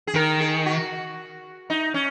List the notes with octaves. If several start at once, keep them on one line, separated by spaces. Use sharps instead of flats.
G#4
D#3 A#4
G#4
F#4
D#4
C#4